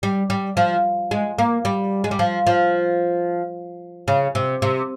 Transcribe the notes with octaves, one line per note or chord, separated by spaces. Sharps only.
G3
G3
F3
G#3
A#3
G3
G#3
G3
F3
F3
C#3
C3
C3